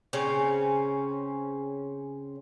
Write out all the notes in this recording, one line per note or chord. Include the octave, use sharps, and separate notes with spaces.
C#3 C4 C#4